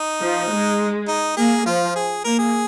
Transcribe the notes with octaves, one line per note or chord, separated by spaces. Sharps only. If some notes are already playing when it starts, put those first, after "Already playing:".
Already playing: D#4
F3
G#3
D#4
A#3 G#4
F3 F4
G#4
A#3 A#4
G#4